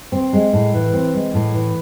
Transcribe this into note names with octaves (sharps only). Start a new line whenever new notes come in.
C4
G#3
A2
E3
C4
G#3
A2
E3